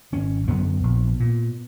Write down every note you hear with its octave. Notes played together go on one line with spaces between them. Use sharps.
G#1 C#4
F#2 D3 B3
A#1
A#2